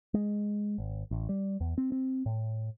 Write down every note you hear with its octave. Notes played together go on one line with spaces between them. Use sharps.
G#3
G#1
A1
G3
E2
C4
C4
A2